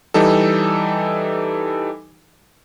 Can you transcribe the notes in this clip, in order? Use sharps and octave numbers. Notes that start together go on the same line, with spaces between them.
E3 G3 D#4 A4